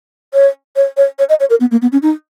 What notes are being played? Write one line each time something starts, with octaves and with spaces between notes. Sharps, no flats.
C#5
C#5
C#5
C#5
D#5
C#5
A#4
B3
A#3
B3
C#4
D#4